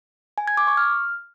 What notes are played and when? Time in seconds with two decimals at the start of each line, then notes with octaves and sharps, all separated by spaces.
0.38 G#5
0.48 G#6
0.57 D6
0.67 C#6
0.77 F6